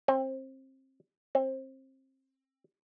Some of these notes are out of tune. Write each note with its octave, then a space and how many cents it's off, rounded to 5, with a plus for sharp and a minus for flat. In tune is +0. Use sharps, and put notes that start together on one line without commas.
C4 +25
C4 +25